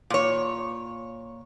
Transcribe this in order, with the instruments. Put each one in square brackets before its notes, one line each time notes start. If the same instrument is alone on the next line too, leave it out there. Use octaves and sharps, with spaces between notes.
[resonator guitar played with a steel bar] A#2 C#5